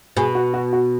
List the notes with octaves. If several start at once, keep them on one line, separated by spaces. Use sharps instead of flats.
B2 G#4
F#4
F#4
F#4